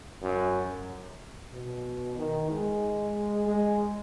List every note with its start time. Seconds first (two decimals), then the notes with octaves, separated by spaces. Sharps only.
0.22 F#2
1.53 B2
2.17 D#3
2.50 G#3
3.47 G#3